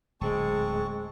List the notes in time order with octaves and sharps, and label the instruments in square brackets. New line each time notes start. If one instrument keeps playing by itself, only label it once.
[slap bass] D1 D2 A#2 [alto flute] G#3 [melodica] C4 A5 C#6